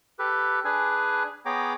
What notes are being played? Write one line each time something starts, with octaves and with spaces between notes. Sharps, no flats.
G4 A4 B4
D4 G#4 B4 G#5
B3 G#4 C#5 G5 A#5 D6